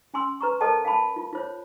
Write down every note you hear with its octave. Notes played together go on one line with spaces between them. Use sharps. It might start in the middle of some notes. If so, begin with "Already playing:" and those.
C#4 G#5 C6 E6
B4 A#5 C#6
A4 A#4 C5 D#5 G5 A5
F5 G#5 A5 B5
F4
F4 C5 C#5